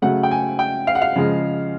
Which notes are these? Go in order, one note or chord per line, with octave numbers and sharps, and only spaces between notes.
C#3 F#3 A3 F#5
G5
G#5
G5
F5
F#5
F5
C#3 F3 G#3